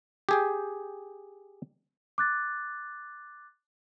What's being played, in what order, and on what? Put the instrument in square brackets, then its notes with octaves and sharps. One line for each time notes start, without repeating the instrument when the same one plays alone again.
[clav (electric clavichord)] G4 G#4 G5
[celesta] D6 F#6 A6